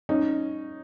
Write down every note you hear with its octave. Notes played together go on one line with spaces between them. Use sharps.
C#4 D#4